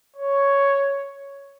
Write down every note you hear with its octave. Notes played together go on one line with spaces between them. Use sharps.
C#5